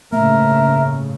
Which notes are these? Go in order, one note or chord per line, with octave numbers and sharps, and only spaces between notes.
G1 A2 C#3 A3 A#3 A#4 E5